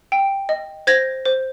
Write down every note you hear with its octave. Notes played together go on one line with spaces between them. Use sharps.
G5
D#5
C5 G#6 A#6
C5